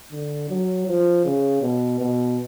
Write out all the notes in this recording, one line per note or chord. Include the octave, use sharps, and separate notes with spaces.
D3
F#3
F3
C#3
B2
B2